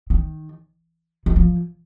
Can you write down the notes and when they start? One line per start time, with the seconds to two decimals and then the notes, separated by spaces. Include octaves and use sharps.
0.10 D#3
1.26 D#3
1.36 F3